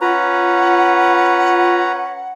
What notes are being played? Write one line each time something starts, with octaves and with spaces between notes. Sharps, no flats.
C#4 F4 B4 F#5 A#5